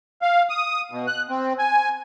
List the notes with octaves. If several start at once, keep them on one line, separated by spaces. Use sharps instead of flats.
F5
D#6
B2
F#6
C4
G#5